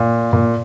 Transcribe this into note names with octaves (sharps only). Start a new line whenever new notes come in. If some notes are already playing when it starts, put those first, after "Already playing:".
Already playing: A#2
A#2